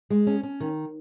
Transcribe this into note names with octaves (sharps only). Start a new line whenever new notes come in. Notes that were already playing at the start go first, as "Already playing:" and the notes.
G#3
C#4
C#4
D#3